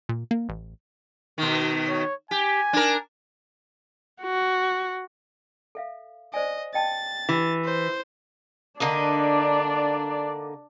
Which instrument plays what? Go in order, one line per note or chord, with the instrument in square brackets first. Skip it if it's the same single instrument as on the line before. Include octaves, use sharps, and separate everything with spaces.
[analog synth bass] A#2
A#3
A1
[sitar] B2 D#3
[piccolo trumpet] C#5
[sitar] G4 [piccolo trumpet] G#5
[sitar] D4 A#4
[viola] F#4
[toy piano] A4 E5 F5
[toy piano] C5 D5 G#5 [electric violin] D#5
[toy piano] D#5 G5 A5 [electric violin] A6
[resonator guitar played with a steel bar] E3 [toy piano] G4
[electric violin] C5
[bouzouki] D3 A#3 D#4 [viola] D4 D5